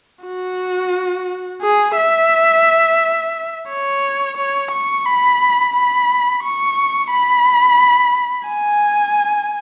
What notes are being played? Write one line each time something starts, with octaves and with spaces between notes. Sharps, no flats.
F#4
G#4
E5
C#5
C#5
C#6
B5
B5
C#6
B5
G#5